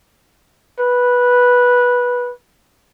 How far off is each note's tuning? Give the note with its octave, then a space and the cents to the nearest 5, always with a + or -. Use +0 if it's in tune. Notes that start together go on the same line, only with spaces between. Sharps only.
B4 -10